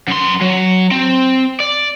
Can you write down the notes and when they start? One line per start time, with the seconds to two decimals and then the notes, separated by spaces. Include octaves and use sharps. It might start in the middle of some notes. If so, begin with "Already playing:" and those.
0.08 F#2 C6
0.42 F#3
0.92 C4
1.60 D5